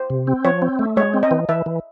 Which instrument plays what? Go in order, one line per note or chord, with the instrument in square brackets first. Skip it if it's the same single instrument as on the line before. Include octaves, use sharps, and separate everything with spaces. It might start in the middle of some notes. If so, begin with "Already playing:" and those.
Already playing: [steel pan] C5
[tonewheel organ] C3
C4
[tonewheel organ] F3 [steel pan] C#5
[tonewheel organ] C4
A3
[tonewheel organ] G#3 [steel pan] C#5
[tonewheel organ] C4
[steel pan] D#5
[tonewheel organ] E3
[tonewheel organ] E3 [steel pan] E5
[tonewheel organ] E3